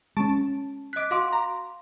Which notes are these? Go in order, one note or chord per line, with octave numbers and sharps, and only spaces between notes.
G#3 C#4 A5 C#6 D7
D#5 D6 F#6 B6
F#4 F5 C6 D6
A#5